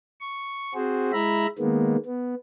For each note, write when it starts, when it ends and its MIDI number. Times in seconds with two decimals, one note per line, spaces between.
0.21 0.73 85
0.74 1.11 60
0.74 1.11 66
0.74 1.11 68
0.74 1.11 72
1.12 1.47 56
1.12 1.47 64
1.12 1.47 76
1.12 1.47 82
1.12 1.47 83
1.59 1.96 51
1.59 1.96 56
1.59 1.96 58
1.59 1.96 59
2.05 2.35 59